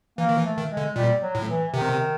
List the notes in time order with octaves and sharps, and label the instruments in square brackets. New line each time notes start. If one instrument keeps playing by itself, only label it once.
[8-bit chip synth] E3 [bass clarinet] A#3
[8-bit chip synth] D#3
E3
[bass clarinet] A3
[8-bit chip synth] D#3
[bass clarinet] G#3
[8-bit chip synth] D3
[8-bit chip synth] A#2 [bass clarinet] G3
[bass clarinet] F#3
[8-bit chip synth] A2
[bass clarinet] E3
[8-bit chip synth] C3 [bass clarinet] D#3